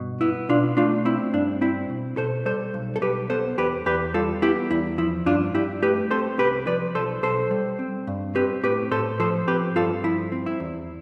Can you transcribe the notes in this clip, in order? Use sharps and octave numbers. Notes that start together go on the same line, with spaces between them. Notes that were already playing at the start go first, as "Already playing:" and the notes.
Already playing: G2 B2
B3 E4
B2 D4 F4
A3 D4 F4
C4 E4
G2 D4
C4 E4
B2
B2 A4 C5
G3 A4 C5
B1
A4
B1 G4 B4
B3 A4 C5
E2 G4 B4
E2 G4 B4
G3 F4 A4
B3 E4 G4
E2 E4
F3 E4
G2 D4 F4
G2 E4 G4
A3 G4 B4
C4 A4 C5
C2 G4 B4
F3 B4 D5
B1 A4 C5
B1 A4 C5
G3
C4
G2
C4 G4 B4
A2 G4 B4
A2 A4 C5
F3 A4 C5
C4 G4 B4
G2 F4 A4
F3 E4
C4
E4
E2